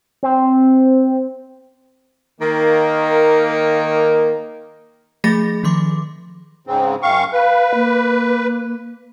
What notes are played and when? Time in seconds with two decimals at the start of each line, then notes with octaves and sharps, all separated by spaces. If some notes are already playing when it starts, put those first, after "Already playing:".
0.23 C4
2.41 D#3 A#3
5.24 F3 A3 G#4 B5 A6 A#6
5.63 D#3 F3 C6 D6
6.67 G#2 C#3 C4
7.03 F#2 F5 G5 C#6
7.33 B4 F5
7.74 A#3